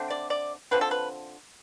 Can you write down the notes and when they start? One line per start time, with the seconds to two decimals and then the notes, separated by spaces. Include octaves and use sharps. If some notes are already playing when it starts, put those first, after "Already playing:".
Already playing: D3 A3 C4
0.10 D5
0.30 D5
0.71 D3 F3 C4 B4
0.81 A4
0.91 B4